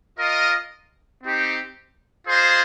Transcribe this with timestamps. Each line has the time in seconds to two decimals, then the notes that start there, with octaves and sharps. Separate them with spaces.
0.19 F4 A#4 D#5
1.23 C4 D#4 G4
2.27 F4 G#4 C5 D#5